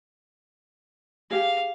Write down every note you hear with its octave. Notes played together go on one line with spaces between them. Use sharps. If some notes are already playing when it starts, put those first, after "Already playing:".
G4 G#4 F5